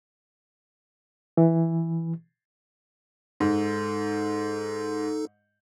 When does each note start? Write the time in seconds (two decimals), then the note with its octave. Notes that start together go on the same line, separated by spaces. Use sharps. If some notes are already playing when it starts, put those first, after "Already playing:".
1.37 E3
3.40 G#2 D#4 A4